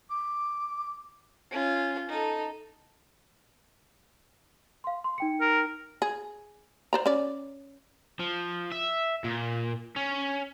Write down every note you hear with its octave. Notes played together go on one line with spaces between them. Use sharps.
D6
C#4 F4
D#4 A4
F5 C6
C6
D#4 G5 C#7
A#4
G#4
C5 D5 A#5
C#4 D5
F3
E5
A#2
C#4